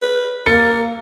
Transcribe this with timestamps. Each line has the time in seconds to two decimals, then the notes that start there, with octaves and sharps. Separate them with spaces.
0.03 B4
0.46 A#3 A#4 A6 C#7